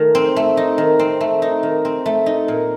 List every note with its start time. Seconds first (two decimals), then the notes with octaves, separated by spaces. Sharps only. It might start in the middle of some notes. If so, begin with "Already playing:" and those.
Already playing: D#3 A3 D#4
0.15 C4
0.36 A3
0.57 D#4
0.78 D#3
0.99 C4
1.21 A3
1.42 D#4
1.63 D#3
1.85 C4
2.06 A3
2.26 D#4
2.48 A#2